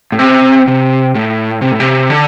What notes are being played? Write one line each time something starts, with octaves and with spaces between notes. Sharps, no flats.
A2
C3
C3
A2
C3
A2
C3
D3